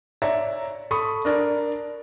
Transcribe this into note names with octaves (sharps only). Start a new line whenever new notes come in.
C#5 D5 E5 A#5
A4 B5 C#6 D#6
D4 A#4 D5